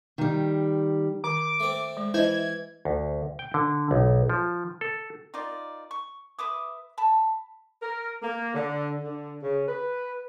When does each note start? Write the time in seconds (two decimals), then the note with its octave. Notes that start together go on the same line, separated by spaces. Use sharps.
0.18 D#3 G3
1.24 D#3 D6
1.60 A3 C4
1.97 G#3
2.14 E3 E4 C5 D#5 E5 G#6
2.85 D2
3.39 G5
3.54 D3
3.91 B1
4.29 F3
4.81 A4
5.34 D#4 F4 A#4 D5
5.91 C#6
6.39 B4 E5 D6 D#6
6.98 A5 B5
7.82 A#4
8.22 A#3
8.53 D3
9.03 D3
9.42 C#3
9.67 B4